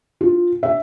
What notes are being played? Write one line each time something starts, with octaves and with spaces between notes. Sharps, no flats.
F4
E5